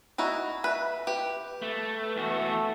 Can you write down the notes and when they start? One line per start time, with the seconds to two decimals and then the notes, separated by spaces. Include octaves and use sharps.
0.18 D#4 E4 F#4
0.64 B4 E5
1.07 G4 B4
1.62 A3
2.17 E2 A3 F#4